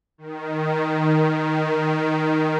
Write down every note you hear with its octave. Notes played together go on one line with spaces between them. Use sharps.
D#3